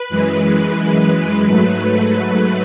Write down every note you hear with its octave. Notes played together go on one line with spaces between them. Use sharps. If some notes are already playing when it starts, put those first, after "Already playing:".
Already playing: B4
F#2 E3 G#3
B4
B4
G#2 F#3 A3
B4